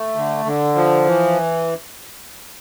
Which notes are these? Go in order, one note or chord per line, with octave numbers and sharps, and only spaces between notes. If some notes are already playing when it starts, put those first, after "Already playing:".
Already playing: A3
D3
D3
F3
E3